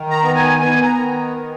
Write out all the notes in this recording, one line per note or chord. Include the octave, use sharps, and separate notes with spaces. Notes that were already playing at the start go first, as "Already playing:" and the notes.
Already playing: D#3
A#5
B3
G#5
B3 G#5
A#5
D#3